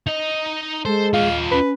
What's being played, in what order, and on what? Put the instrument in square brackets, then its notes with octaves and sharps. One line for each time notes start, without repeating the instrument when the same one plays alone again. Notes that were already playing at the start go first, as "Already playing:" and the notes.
[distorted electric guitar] D#4 D#5
[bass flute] G#3 [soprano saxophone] A4 [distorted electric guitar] C5
[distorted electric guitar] F4 D#5 [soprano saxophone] F5
[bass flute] C#4 [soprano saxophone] B4